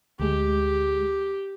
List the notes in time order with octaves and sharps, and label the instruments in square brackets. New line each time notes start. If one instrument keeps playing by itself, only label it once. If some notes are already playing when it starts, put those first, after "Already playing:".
[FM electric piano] D2 G#3 [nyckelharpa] G4